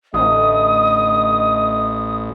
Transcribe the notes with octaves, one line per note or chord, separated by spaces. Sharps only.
A1 D3 A3 D#5 D#6